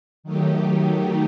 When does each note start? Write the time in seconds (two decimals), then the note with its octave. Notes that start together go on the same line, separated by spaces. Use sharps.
0.24 D#3 F#3 A3 D#4 G4